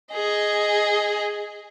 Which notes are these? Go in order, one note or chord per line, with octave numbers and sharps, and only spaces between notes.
G#4 D#5